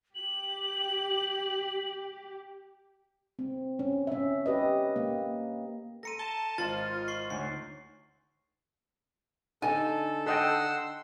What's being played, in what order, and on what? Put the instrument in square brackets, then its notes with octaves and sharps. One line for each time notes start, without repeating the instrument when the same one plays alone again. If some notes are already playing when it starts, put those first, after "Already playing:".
[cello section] G4 [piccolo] F#7
[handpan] C4
C#4
C#4 E5
G4 B4 D#5
A#3
[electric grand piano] A4 A#5 C6 [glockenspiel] A#6 C#7 D#7
[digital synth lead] A5 [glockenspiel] G7
[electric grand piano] G#1 C5 D#5 [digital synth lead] F4 [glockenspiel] C6 A6
[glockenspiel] C6 C#6 C7
[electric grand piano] D2 D#4 C#5 [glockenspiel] C7
[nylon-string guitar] D3 D#4 [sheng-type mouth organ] A4 [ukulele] G#5
[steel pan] A4 D#5 G5 [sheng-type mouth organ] F#5 C6 E6